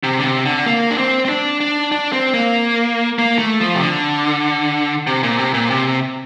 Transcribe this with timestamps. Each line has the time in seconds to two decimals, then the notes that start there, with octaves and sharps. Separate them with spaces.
0.03 C3
0.18 D3
0.24 C3
0.45 D3
0.66 A#3
0.91 D4
0.98 C4
1.25 C4
1.29 D4
1.60 D4
1.92 D4
2.12 C4
2.34 A#3
3.19 A#3
3.39 A3
3.60 F3
3.75 C3
3.81 D3
5.07 C3
5.23 A#2
5.38 C3
5.54 A#2
5.70 C3